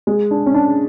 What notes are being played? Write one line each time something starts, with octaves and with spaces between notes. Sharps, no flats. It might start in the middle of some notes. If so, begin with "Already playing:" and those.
G#3
D4
C#4
D4